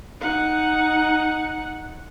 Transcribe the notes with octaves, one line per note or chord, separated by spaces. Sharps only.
D#4 F#5